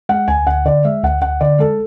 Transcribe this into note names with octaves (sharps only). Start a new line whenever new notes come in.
G#3 F#5
D2 G#5
D2 F#5
D3 D5
G#3 E5
D2 F#5
D2 F#5
D3 D5
G#3 A4